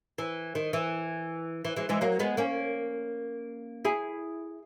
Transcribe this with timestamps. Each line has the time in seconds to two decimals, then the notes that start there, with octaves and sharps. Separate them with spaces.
0.18 E3
0.55 D#3
0.73 E3
1.65 E3
1.76 E3 G#3
1.89 E3 G#3
2.01 F#3 A#3
2.19 G#3 B3
2.37 A#3 C#4
3.85 E4 G#4